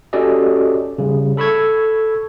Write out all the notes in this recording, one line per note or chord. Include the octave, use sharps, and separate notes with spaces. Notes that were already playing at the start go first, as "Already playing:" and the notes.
C#4 F#4 G4 A4 D5 D#5
C#3 G3
A4 B5 C#6 E6 G#6